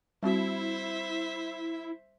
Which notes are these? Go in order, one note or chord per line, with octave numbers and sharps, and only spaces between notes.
G3 C4 E4 F#4 C5 E5